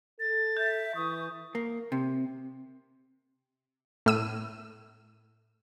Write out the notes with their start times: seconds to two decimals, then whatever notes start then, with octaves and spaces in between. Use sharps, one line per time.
0.20 A4 A6
0.57 E5 G6
0.96 E3 C#6 D#6
1.55 A#3
1.92 C3
4.06 A2 E6 D#7